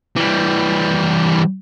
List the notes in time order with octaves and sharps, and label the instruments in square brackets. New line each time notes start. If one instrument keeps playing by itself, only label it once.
[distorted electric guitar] E3 G3